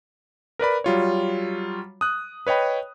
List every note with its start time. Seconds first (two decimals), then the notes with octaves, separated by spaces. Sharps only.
0.59 A#4 B4 D5 B5
0.84 F#3 G3 F4 C#5
2.01 D#6 F#6
2.47 B4 C#5 D#5 G5 B5